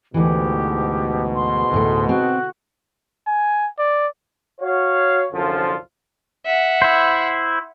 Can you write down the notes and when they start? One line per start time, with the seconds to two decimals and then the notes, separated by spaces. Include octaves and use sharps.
0.14 D2 G#2 B2 E3 G4
1.34 C6
1.72 D2 A2 A3
2.09 C4 F#4
3.27 G#5
3.78 D5
4.60 F#4 C#5 F5
5.32 C2 F#2 D3 F3 F4 A4
6.45 E5 F#5
6.82 E4 C5